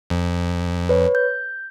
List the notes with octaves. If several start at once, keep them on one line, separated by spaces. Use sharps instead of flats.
F2
B4 C#5
G6